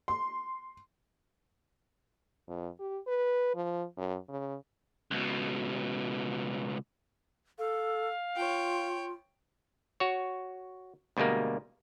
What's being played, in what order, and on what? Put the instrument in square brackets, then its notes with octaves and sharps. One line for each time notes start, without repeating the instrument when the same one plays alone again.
[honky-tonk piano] C6
[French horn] F2
G4
B4
F3
F#2
C#3
[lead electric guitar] C#2 B2
[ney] A4 [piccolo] F5
[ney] F4 [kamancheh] C#5 G5
[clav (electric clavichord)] F#4 C#5
D2 B2 G3 G#3 A#3